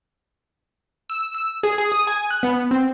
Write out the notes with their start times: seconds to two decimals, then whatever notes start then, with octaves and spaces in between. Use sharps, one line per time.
1.10 E6
1.34 E6
1.63 G#4
1.78 G#4
1.92 D#6
2.07 G#5
2.31 F#6
2.43 B3
2.71 C4